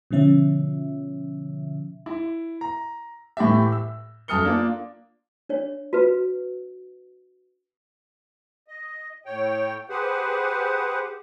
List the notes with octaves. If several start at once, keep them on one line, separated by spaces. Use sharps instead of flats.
B2 D3 F3 C#4 E5
E4
A#5
A2 E3 G4 E5
E6
F#2 A4 D#6 F6 C#7 G7
A#3 D4 F4
D4 C#5
F#4 B4
D#5
A2 C#5 G5
G4 G#4 B4 C5 F#5